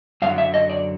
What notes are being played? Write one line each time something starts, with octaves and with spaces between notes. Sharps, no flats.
F#2 D3 F#3 F5
E5
D#5
D5